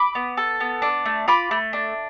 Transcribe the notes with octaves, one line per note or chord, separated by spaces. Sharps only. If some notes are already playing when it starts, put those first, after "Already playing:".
Already playing: B5 D6
B3
A4
B3
D4
A3
F4 B5 D6
A3
D4